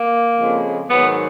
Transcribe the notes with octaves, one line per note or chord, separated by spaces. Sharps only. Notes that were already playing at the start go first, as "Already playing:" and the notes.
Already playing: A#3
F2 C#3 F3 G#3
G#2 D#3 F#3 B3